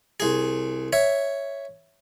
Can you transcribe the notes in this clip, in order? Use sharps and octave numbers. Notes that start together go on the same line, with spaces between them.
C2 G#4
C#5 E5